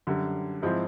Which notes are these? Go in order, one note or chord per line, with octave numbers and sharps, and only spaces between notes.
F#2 D3 G3
G#2 F3 G#3 C4 E4